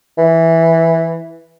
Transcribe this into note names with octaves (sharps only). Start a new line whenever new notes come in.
E3